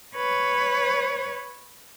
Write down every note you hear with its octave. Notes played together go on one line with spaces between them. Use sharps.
B4 C#5